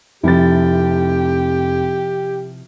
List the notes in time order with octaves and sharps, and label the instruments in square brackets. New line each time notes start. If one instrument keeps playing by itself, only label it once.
[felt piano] F1 A6 [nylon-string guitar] C3 F3 E4 [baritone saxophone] G4